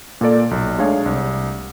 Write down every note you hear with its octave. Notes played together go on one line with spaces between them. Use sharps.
A#2 A#3 A4 D5
B1
G#3 A3 D4 G#4 C#5 F5
C2